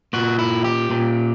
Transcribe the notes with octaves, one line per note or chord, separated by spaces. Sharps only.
A#2 F#4
E4
G4
A#2